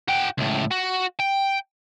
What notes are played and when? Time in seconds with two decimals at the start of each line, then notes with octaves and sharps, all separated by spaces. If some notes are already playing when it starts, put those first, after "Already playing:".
0.08 F#4 G5
0.38 C#2 A2
0.71 F#4
1.20 G5